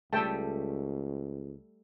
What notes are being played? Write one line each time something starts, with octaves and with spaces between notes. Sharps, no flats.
C#2 G3 A3 A4 G5 A5